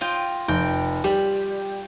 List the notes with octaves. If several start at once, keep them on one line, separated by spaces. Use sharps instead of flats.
F4 D#5 G5
F1 G5
G3 G4